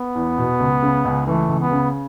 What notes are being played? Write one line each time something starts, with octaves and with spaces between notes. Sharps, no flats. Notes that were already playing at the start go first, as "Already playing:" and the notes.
Already playing: B3
E2
B2
C#2
C#3
C#2
E3 A3
C#2
B3
C#3